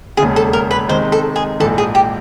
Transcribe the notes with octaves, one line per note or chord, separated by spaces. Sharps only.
E1 D#2 C#3 G#4
A4
A#4
B4
C3 D#3 G#3 C5
A4
G#4
A#1 G#2 E3 A4
G#4
G4